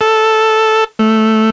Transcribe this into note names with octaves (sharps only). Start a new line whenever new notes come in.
A4
A3